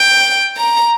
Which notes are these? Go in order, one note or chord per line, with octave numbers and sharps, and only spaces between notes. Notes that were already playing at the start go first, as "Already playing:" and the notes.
Already playing: G5
A#5